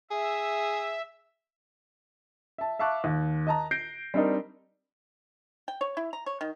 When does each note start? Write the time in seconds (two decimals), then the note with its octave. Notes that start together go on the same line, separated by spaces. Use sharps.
0.11 G#4 E5
2.58 E5 A5
2.79 E5 F5 A5 C#6 D6 F#6
3.04 D#2
3.47 D#5 A5 A#5
3.71 G6 A#6 C7 D7
4.14 G3 C4 D4 D#4 A#4
5.68 G5
5.81 C#5
5.97 E4
6.13 A#5
6.26 C#5
6.41 D#3